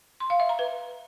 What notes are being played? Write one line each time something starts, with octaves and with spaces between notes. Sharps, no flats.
C6
F5
E5
A#5
B4